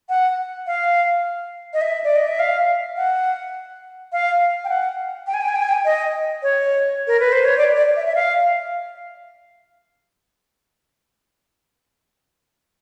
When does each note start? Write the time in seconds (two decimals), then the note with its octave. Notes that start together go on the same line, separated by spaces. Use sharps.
0.09 F#5
0.67 F5
1.74 D#5
1.81 E5
2.04 D5
2.16 D#5
2.28 E5
2.39 F5
2.97 F#5
4.13 F5
4.64 G5
4.69 F#5
5.27 G5
5.34 G#5
5.41 G5
5.48 G#5
5.55 G5
5.62 G#5
5.69 G5
5.85 D#5
6.43 C#5
7.07 A#4
7.20 B4
7.32 C5
7.45 C#5
7.58 D5
7.76 D5
7.96 E5
8.07 E5
8.15 F5